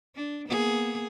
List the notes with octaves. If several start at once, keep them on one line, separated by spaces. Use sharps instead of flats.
D4
A#3 B3 G#4